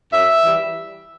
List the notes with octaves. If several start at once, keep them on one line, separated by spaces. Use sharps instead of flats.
F#2 E5
E3 G3